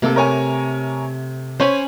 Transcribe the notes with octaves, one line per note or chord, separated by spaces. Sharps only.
C3 A3 A#3 A4 D6
A#4 C#5 G#5
C#4 C5 C#5 G#5 B5